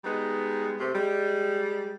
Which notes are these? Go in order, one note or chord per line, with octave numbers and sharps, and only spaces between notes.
G3 G#3 B3 D#4
C3 A3
G3 G#3